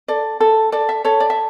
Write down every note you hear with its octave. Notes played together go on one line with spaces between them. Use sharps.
A4 D5
A4
A4 D5
E5
A4 C#5
D5
E5